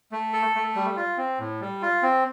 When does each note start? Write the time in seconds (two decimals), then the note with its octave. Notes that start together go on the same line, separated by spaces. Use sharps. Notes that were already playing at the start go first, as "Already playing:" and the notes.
0.12 A3
0.33 A4
0.55 A3
0.76 G3
0.96 F4
1.18 C4
1.39 A2
1.61 G3
1.82 F4
2.03 C4